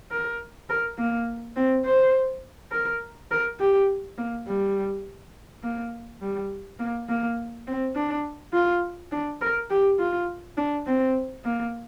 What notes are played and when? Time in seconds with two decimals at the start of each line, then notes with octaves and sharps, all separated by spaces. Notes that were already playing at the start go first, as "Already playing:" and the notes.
0.11 A#4
0.69 A#4
0.98 A#3
1.56 C4
1.85 C5
2.72 A#4
3.31 A#4
3.60 G4
4.18 A#3
4.47 G3
5.63 A#3
6.22 G3
6.79 A#3
7.09 A#3
7.67 C4
7.96 D4
8.53 F4
9.12 D4
9.41 A#4
9.70 G4
9.99 F4
10.57 D4
10.86 C4
11.45 A#3